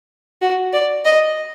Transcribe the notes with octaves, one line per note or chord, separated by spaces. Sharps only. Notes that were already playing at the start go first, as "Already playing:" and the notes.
F#4
D5
D#5